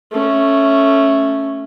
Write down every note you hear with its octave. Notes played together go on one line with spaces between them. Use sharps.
A3 C#4